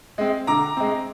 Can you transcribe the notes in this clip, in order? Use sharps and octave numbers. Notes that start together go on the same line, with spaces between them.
G#3 C4
D3 A#5 D6
G#3 C4